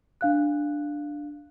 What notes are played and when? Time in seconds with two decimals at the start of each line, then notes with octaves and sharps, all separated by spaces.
0.21 D4 F5 F#6